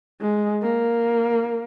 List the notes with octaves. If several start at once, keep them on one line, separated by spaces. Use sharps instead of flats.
G#3
A#3